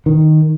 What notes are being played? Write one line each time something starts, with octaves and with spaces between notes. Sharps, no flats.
D#3